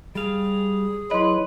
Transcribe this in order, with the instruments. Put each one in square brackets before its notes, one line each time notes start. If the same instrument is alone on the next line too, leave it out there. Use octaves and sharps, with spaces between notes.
[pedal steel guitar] G3 F5 [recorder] G#4
[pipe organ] F#3 E4 [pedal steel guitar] B4 [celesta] D#5 C6